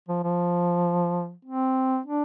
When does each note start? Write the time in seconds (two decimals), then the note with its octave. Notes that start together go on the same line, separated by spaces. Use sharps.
0.09 F3
0.23 F3
1.45 C4
2.06 D4